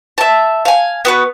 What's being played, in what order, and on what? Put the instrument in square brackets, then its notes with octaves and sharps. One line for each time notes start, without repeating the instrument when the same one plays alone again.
[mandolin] E5 A5
F5 G#5
B3 F#4 B4